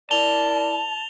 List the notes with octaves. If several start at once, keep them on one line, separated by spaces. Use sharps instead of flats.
E4 A#4 D5 A5 F7 G7